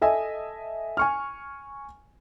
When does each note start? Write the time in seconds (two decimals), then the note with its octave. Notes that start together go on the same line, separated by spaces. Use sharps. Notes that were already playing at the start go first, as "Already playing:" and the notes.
0.01 A4 D#5 E5 G#5
0.97 G#5 C#6 F6